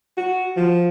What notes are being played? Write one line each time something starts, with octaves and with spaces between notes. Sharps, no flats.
F#4
F3